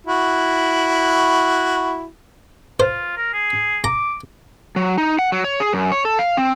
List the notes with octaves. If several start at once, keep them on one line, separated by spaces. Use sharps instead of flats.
E4 F#4
F4 C5
A#4
G#4
A#5 D6
F#3
D#4
F#5
F#3
C#5
G#4
F#2
C#5
A4
F5
C4